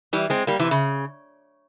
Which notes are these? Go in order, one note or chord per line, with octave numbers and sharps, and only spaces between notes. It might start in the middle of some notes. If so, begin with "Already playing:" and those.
E3 G3
G#3 C4
G3 A#3
C3 E3
C#3